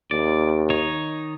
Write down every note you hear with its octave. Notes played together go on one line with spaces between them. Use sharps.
D#2 D5
D#3 D#4 C#5